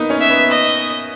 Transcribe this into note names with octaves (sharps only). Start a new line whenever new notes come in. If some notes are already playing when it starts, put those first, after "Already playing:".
Already playing: A#3 B3 D#4
C#4
E5
B3
D#5